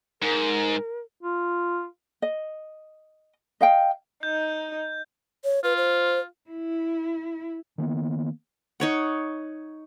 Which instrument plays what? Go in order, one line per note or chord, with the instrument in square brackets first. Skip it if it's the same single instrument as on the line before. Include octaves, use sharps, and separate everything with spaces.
[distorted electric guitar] G#2 [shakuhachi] A#4
[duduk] F4
[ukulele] D#5
D#5 F5 G5
[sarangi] D#4 [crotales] G6
[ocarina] C#5
[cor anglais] F4 [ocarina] B4
[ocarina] C5
[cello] E4
[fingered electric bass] D#3 A#3 B3
[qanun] D#4 C#5 F#5